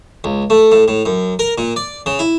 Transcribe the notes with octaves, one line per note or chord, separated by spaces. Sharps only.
C#2
A3
A2
A2
F#2
A#4
A#2
D5
C#3
E4